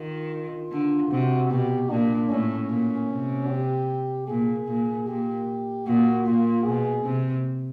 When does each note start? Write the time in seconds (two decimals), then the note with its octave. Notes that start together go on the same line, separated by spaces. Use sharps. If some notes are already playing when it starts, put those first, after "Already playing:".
Already playing: D#3 F4
0.72 D3
1.10 C3 F#4
1.50 B2 G4
1.90 A#2 D4
2.30 A2 C#4
2.70 A#2
3.09 C3
3.48 G4
4.27 A#2 G#4
4.67 A#2
5.07 A#2 G4
5.87 A#2 F#4
6.26 A#2 F4
6.65 B2 G#4
7.05 C3